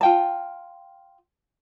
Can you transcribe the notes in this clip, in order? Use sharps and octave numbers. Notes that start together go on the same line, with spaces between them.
F4 G5 A5